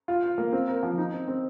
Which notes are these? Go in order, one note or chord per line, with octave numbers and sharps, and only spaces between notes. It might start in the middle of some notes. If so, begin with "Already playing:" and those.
F4
F5
A#3
C4
A#4
F3
D#4
C4
C4